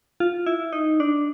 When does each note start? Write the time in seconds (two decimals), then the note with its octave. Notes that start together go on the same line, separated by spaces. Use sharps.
0.20 F4
0.46 E4
0.73 D#4
1.00 D4